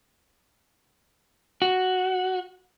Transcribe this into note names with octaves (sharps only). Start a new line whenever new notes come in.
F#4